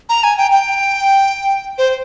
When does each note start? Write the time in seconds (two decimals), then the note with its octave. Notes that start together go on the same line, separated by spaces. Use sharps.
0.09 A#5
0.24 G#5
0.38 G5
0.51 G5
1.78 C5